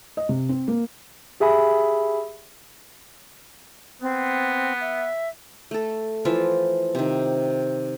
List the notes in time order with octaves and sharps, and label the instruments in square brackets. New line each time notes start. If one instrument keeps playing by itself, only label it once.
[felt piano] D#5
C3
C4
A#3
[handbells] G4 G#4 E5 G#5 B5
[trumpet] B3 [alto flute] C4
[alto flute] E5
[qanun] A3 A4
E3 F3 F4 E5
C3 D#3